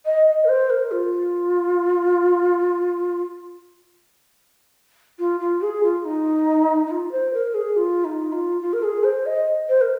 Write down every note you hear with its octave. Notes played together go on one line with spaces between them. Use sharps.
D#5
D#5
A#4
C5
A#4
F4
F4
F4
G#4
F4
D#4
D#4
F4
C5
A#4
G#4
F4
D#4
F4
F4
A#4
G#4
C5
D#5
C5
A#4